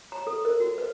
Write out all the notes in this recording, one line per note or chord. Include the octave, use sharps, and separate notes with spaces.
A#5
A4
A#4
F#4
B4